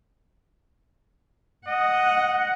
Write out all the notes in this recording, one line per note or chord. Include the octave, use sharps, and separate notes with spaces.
D#5 F#5